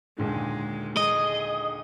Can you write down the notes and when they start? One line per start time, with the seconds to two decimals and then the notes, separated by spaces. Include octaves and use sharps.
0.18 D#2 A#2 D3 G#3
0.97 G#4 D#5